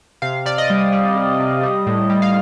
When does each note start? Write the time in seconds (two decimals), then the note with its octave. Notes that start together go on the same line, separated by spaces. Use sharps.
0.22 C3 F5
0.46 C3 D5
0.58 D#5
0.70 G3
0.93 G3
1.17 C3
1.40 C3
1.63 G3
1.87 A2
2.10 G3
2.22 F5